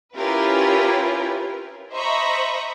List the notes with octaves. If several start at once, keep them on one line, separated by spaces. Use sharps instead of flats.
C#4 E4 F4 G4 A#4 B4
C5 D#5 E5 A#5 B5 C#6